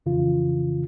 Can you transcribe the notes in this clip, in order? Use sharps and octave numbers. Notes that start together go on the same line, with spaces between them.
F2 C#3 E3 F4